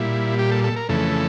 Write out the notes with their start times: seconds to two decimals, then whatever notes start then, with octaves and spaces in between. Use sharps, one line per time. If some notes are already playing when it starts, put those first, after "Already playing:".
Already playing: A#2 G3 E4
0.39 G4
0.52 A4
0.64 A4
0.76 A#4
0.89 F2 C#3 E3 A3 A4